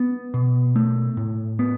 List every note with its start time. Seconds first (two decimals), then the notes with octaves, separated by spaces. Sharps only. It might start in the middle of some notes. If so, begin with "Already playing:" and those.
Already playing: B3
0.34 B2
0.76 A3
1.17 A2
1.59 B3